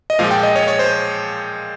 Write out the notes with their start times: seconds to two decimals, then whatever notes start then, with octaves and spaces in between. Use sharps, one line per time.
0.10 D#5
0.19 A#2 F3 G#3 F5
0.31 G5
0.43 D#5
0.56 C#5
0.68 C#5
0.79 C5